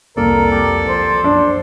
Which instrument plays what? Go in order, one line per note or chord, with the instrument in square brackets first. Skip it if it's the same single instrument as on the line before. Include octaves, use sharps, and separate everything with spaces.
[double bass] C2 F2 [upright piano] A#3 [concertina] A4 D5 [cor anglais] A#4
[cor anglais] G4
[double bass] F3 [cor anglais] C5
[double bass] F#2 [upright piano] D4